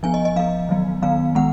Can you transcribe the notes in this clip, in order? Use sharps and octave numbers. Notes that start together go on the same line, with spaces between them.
F3 B3 G#5
D#5
D#5
F3 B3 F5
D#3 F#3 B3
D#3 F#3 B3 F5
D#3 G#3 B3 F#5